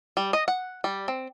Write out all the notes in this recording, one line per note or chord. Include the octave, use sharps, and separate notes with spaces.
G3
D#5
F#5
G3
C4